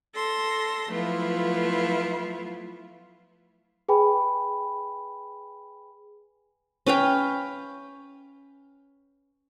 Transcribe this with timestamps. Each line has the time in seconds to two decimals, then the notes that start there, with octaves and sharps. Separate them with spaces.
0.15 A4 C6 A#6
0.89 F3 F#3 A3 B3 E4 F4
3.89 G#4 B4 G5 G#5 B5
6.86 C#4 B4 F5 G5